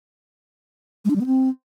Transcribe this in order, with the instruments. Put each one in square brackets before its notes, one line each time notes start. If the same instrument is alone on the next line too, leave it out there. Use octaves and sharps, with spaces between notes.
[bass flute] G#3
D4
G3
B3
C4